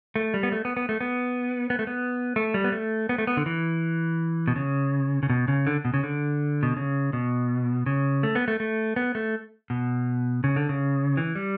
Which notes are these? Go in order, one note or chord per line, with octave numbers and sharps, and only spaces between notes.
A3
G3
B3
A3
B3
B3
A3
B3
B3
A3
B3
A3
G3
B3
A3
B3
A3
B3
D3
E3
B2
C#3
C#3
B2
C#3
D3
B2
C#3
D3
B2
C#3
B2
C#3
A3
B3
A3
A3
B3
A3
B2
C#3
D3
C#3
E3
G3